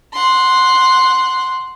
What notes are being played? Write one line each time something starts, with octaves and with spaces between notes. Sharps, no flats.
F#5 C6